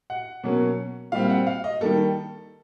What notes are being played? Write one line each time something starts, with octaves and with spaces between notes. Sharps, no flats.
F#5
B2 F#3 A#3 C#4
A#2 G3 C4 F5
F#5
F5
D#5
D#3 G3 A#3 A4